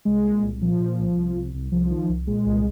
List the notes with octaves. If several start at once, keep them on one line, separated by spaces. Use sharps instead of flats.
C2 G#3
A#2
C2
A#2 F3
A#2
C2
C2
C2
C2
C2 F3
D#3
C2
A#2 G#3
C2